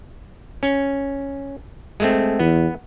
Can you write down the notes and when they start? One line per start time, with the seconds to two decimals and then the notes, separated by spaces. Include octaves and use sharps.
0.63 C#4
2.00 G#3 A3 C4
2.39 E2 B3